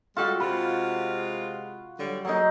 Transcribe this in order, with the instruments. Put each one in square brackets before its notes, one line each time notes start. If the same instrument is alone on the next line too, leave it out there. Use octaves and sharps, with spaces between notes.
[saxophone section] G3 G#3 A4 [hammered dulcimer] F4 F#4
[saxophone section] C3 G#3 F4 [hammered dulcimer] B5
[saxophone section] D3 F#3 G3
[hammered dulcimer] F#3 D#4 [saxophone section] A#3 G#4 A4